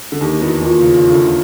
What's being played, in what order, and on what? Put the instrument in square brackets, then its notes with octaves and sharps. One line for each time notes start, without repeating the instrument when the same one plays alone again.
[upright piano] D3
[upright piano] D#2 D#3 [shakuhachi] G4
[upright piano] E2 E3 [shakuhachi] F#4
[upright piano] D#2 D#3 [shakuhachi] F4 F#4
[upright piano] C#3
C#3
C#3
D2 D3
C#3